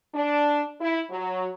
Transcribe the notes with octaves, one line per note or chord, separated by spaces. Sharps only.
D4
E4
F#3